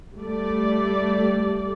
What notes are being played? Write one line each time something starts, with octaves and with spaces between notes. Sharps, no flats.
G3 A3 D5